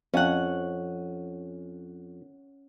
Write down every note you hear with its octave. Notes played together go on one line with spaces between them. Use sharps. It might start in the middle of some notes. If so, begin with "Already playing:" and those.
F2 C#4 F#5